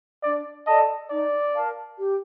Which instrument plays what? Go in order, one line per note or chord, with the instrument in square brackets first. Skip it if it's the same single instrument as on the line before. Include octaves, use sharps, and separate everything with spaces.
[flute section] D4 [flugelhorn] D5
[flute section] A4 D5 A5 [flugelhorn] D#5
[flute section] D#4 [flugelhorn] D5
[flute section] A#4 F5 A5
G4